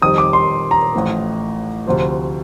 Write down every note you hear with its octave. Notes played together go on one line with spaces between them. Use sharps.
F2 D#3 G3 D#6
D6
C6
A#5
A1 A2 F3
D2 C3 F3